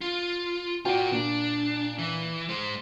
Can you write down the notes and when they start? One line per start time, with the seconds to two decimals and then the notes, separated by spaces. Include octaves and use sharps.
0.01 F4
0.85 F4 F#4 D5 G5
1.12 A#2 D4
1.98 E3
2.49 G#3 C5